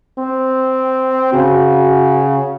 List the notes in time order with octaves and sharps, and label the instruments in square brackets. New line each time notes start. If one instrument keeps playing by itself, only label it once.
[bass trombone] C4
[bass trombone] C#3 [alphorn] F#4